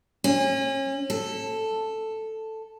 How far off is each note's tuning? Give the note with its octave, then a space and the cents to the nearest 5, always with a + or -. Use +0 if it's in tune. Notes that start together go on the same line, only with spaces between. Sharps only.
C#4 -35
A4 +0